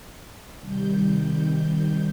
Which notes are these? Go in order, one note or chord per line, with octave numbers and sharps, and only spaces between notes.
C3 D#3 G3 G6